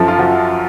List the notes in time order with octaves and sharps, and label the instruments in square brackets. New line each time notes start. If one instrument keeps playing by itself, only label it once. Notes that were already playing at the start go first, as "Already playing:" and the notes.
Already playing: [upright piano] F#2 F3 A4
F4
F3 F#4